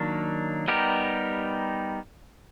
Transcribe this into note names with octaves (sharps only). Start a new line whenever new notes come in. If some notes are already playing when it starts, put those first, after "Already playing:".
Already playing: D#3 F#3 A#3 D4
G3 B3 D#4 G4 A#4